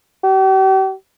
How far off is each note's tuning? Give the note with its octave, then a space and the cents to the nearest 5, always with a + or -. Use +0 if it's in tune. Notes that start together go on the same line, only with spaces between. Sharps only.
G4 -40